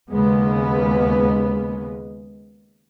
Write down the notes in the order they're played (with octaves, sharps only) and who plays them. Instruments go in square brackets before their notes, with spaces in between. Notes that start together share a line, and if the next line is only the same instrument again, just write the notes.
[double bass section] D#2 C#3 G#3 B3